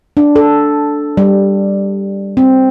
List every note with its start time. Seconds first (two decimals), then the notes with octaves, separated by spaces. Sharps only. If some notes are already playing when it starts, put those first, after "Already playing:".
0.17 D4
0.36 A4
1.17 G3
2.37 C4